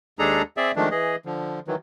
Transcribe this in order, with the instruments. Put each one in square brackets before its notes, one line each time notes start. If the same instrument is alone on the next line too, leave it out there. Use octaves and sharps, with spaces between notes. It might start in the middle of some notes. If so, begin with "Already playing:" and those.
[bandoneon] D#2 G#3 D4 G#4 A4 A#5
C4 G#4 D5 E5
D#3 F3 G#3 A3 D4
E3 G#4 D#5
D3 F3
D#3 E3 F#3